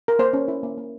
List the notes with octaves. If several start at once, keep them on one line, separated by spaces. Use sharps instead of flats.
A#4
A#3 C5
C#4
E4
A#3
A#3